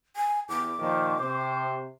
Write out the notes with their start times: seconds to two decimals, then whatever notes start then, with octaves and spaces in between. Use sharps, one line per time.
0.16 G#5
0.49 E2 D6
0.79 A#2 D#3 F3
1.18 C3 C5